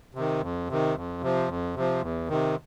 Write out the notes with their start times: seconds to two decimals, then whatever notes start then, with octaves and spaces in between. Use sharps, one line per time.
0.15 C3 D#3
0.42 F2
0.69 C3 D#3
0.95 F2
1.22 C3 F3
1.48 F2
1.75 C3 F3
2.02 E2
2.29 C3 D#3